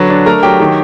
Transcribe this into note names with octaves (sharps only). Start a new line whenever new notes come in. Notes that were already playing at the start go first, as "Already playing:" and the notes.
Already playing: D3 F#3 B4
D4
A3 A#4 A#5
F#3 G4 G5
D#3